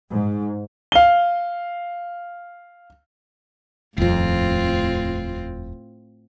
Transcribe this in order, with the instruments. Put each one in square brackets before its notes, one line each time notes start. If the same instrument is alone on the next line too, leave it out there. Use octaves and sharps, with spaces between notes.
[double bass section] G#2
[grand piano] F5 G7
[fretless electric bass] D#1 F2 [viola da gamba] A2 C4 F4